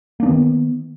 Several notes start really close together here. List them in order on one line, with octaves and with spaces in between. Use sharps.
A#3 D4 B3 D#3